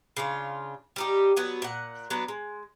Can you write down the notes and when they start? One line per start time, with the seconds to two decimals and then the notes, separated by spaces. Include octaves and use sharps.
0.17 C#3 D4 F4
0.96 G3 D#4 G4
1.36 F#3 B3 F#4
1.62 A#2 F#5
2.10 F#3 B3 D4 B4
2.28 G#3